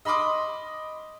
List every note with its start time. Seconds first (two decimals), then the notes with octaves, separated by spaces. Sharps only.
0.05 D#5 B5 C6 D6 D#6